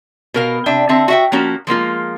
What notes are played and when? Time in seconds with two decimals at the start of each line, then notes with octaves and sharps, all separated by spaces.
0.34 B2 A#4 F5
0.66 C3 D4 E5 G5
0.89 D3 C4 E5 A5
1.08 F#4 E5 G5
1.32 F3 A#3 C#4 F#4
1.67 F3 G#3 A#3 F4